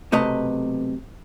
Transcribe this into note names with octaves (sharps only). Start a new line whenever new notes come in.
B1 C3 A3 B4 D#5 A#5